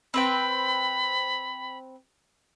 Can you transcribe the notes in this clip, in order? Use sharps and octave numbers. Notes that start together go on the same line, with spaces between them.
C4 B4 G5 B5